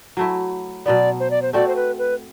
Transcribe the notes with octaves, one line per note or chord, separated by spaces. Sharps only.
F#3 A3 E4
B2 F#3 B3 D5
C5
D5
C5
A3 C4 F#4 D5
C5
B4
B4